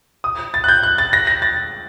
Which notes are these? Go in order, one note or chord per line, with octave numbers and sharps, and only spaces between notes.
D#6
A6
F#6
G6
F#6
A6
A#6
A#6
A6